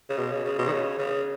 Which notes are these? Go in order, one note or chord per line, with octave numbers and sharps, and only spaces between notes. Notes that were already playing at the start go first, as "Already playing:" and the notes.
C#3
B2
C#3
C#3
B2
D#3
C#3
C#3